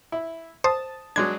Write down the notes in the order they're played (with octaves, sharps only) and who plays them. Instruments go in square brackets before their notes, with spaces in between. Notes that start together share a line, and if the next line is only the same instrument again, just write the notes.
[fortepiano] E4
[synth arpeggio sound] C5 [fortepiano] A5 D#6
[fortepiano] F#3 G#3 D4 [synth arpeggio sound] G#6